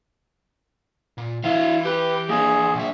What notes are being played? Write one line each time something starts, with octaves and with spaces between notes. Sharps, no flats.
A#2
E3 E4 F5
G4 B4
A#3 D4 G#4
B1 E5